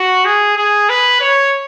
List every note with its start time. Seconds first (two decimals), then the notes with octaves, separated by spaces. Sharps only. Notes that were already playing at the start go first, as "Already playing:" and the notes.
Already playing: F#4
0.25 G#4
0.56 G#4
0.89 B4
1.21 C#5